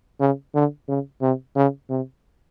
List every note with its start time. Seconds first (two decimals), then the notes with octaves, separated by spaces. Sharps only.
0.20 C#3
0.54 D3
0.88 C#3
1.21 C3
1.56 C#3
1.90 C3